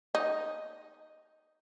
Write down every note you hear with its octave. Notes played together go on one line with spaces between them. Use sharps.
D#4